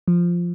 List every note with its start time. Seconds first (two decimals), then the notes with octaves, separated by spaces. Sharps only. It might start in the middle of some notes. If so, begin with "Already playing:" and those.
0.08 F3